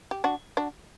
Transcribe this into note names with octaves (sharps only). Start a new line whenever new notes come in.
G4
D4 F#4
D4 F#4